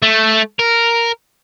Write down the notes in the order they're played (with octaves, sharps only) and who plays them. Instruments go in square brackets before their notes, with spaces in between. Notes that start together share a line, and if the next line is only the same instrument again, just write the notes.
[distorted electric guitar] A3
A#4